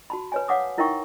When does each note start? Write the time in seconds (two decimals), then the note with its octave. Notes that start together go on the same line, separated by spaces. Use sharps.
0.10 F#4 A5 B5
0.32 B4 C#5 G#5
0.48 C#5 F5 F#5 D6 D#6
0.78 D#4 E4 A#4 E5 G5 C#6